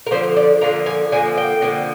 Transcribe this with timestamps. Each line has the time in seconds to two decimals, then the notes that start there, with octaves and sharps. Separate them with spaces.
0.07 A#4
0.11 D3 F3 A#3 C5
0.37 D5
0.61 D3 F3 A#3 A#5
0.86 G#5
1.12 D3 F3 A#3 G#5
1.38 G5
1.62 D3 F3 A#3